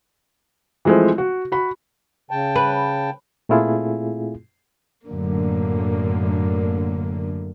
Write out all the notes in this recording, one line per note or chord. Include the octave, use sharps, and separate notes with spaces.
E3 F3 G#3 A3 C4
F#4
F#4 B5
C#3 G5 A5
B4
A#2 A3 C4 E4 F4 G#4
F#2 A2 D3 A#3